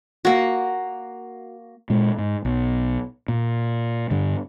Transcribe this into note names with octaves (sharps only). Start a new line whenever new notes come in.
A#3 F#4
A#2 G#3
G#2
B1
A#2
G2 D3